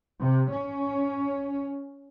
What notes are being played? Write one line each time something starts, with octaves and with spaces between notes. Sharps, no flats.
C3
C#4